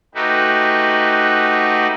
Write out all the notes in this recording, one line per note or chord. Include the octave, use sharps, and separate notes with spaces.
A3 D#4 F#4 G4 B4